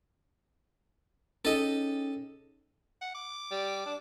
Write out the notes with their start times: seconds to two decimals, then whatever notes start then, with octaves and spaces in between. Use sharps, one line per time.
1.45 C#4 D#4 G#4 A4 D#5
3.01 F#5
3.15 D6
3.51 G3
3.86 D4